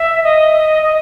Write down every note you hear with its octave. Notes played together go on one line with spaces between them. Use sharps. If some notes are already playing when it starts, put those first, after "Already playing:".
Already playing: E5
D#5
D#5